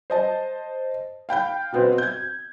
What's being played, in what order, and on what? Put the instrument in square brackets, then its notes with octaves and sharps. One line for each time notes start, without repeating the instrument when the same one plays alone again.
[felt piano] C5 D#5 A5
F5 G5 B5 G6
B2 B3 C4
G6 G#6